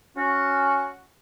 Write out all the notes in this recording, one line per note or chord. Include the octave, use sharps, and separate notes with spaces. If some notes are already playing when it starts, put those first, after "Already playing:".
C#4 F#4